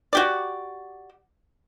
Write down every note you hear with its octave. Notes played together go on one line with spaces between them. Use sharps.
F#4 G4 D5